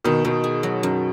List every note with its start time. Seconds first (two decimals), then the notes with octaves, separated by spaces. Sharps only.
0.05 B2 D#3 D#4
0.24 B2 D#3 D#4
0.44 G#4
0.63 F#3
0.83 F#2